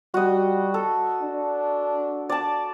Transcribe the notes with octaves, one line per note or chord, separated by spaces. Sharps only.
G3 F#4 D#5
A4
D4
D5 A5